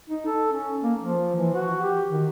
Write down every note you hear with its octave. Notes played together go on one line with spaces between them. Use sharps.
D#4
A4
C#4
A#3
F3
E3
F#4
G4
D#3